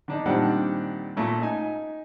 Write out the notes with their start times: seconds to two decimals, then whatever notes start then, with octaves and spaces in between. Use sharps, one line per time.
0.08 D3 D4 D#4
0.25 A#2 D#3 G3 C4 D4 F#5
1.16 A#2 A3 C#4
1.42 D#4 G#5